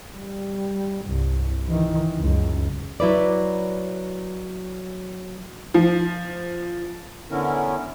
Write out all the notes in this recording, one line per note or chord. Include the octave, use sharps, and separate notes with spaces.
G3
C2 G2
D#3 E3
C#2 F#2
F#3 E4 B4 D5
F3
D3 B3 C#4 E4 A#4